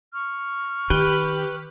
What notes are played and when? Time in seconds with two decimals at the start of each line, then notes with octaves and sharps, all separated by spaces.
0.14 C#6 F6
0.90 D#3 G4 B4